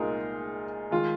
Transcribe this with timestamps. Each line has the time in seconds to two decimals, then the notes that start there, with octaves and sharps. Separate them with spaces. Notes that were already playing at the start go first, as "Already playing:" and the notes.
Already playing: C2 A#2 G#3 D#4 F4 G#4 A#4
0.91 D#3 G#3 F4